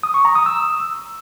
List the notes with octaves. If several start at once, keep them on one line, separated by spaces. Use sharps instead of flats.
D#6
C#6
A#5
D#6
E6